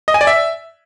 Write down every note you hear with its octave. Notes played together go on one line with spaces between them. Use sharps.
D#5
G#5
D5
E5